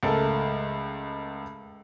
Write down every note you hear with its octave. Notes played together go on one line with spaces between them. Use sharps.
C#2 A3 A4 A#4